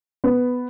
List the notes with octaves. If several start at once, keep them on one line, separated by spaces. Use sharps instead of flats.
B3